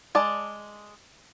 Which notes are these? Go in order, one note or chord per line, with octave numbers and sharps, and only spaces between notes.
G#3 D5 A5